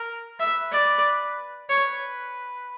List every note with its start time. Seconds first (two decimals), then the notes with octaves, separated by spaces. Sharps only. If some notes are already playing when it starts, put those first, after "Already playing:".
Already playing: A#4
0.39 B4 E5
0.71 D5
1.69 B4 C#5